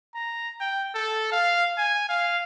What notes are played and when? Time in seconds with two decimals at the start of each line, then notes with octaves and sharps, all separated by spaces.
0.14 A#5
0.60 G5
0.95 A4
1.32 F5
1.78 G#5
2.09 F5